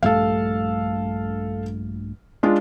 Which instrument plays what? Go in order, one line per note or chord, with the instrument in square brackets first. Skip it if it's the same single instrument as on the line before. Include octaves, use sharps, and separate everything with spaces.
[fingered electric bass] A#1 G2 A3 [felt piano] A4 F5
[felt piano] G#3 D4 F4